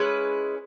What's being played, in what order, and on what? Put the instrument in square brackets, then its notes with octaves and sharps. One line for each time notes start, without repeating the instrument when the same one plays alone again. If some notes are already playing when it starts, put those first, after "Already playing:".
Already playing: [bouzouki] G#3 C#4 E4 B4